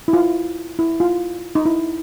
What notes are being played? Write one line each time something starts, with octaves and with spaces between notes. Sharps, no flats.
E4
F4
E4
F4
D#4
E4